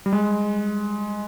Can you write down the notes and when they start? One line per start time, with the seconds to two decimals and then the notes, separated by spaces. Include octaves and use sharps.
0.06 G3
0.13 G#3